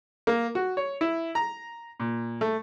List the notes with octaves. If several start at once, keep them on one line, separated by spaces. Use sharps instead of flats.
A#3
F#4
C#5
E4
A#5
A#2
A3